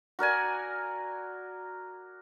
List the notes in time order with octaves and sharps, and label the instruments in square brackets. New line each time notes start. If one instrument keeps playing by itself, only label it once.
[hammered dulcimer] F#4 A#4 D5 G#5